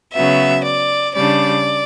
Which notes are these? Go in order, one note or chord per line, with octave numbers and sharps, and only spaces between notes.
C#3 F#3 B3 E5
D5
C#3 G3 D4 D5